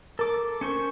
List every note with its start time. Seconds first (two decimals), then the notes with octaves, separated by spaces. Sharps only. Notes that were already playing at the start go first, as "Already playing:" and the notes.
0.19 A4 A#4 D6
0.61 C#4 C5 C#6